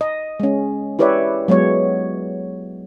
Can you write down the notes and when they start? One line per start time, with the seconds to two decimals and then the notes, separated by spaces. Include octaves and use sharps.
0.01 D#5
0.40 G#3 C#4
0.99 E4 G4 B4 C#5 D5 E5
1.48 F#3 G#3 B3 C#5